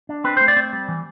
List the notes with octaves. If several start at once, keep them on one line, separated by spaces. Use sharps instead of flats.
D4
C4 B4
A3 C5
D5
C4
G3
E3